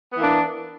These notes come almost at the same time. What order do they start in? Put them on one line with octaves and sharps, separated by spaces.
B3 E3 A#3 D4